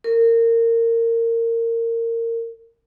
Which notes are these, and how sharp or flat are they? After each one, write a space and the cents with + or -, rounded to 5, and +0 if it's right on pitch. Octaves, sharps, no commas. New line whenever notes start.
A#4 -25